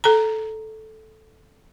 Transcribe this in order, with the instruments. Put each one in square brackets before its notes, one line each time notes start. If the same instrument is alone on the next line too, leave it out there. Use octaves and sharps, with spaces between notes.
[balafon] A4 A#5